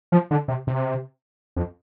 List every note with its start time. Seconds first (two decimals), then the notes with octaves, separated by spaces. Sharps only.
0.12 F3
0.31 D3
0.48 C3
0.67 C3
1.56 F2